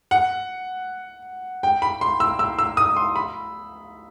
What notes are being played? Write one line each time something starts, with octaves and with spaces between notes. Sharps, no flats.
F#5
G5
B5
C6
E6
E6
E6
D#6
C6
B5